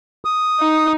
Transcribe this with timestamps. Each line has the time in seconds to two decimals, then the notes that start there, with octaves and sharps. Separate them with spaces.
0.25 D#6
0.60 D#4